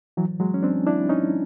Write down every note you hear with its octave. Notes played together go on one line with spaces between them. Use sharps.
E3 F#3
F#3 G#3
C#4
C4 D4
D4 E4
C#4 D#4